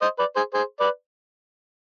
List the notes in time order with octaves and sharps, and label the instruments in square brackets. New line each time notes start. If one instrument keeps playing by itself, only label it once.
[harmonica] C5 D#5
B4 D5
G#4 C5
G#4 C5
B4 D5